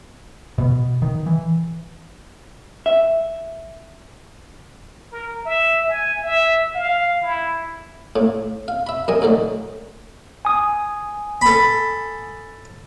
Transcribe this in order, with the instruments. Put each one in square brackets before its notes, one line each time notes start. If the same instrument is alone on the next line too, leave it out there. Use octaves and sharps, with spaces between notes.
[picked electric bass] B2
D#3
E3
[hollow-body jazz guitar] E5
[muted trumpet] A#4
E5
G#5
E5
F5
E4
[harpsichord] A2
F5
E5 B5
F#2 A#4 D#5 G#5
F#2 A2 D3 D#3
[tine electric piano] G#5 D#6
[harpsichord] A4 B5